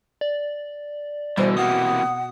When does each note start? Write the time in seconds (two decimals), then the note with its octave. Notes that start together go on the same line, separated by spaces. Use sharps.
0.21 D5
1.37 B2 D3 E3 G3 C5
1.57 C3 E3 A#3 F#5 D#6